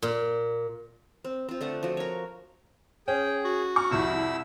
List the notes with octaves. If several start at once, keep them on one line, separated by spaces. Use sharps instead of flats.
A#2
C4
C4 F4
D3 A3 F#5
F3 F#4
A#4 C#5
C#4 G#4 G5
F#4
C#6 F6
C2 F2 E4 E6